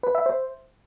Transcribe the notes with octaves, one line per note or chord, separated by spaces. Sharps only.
B4
E5
C5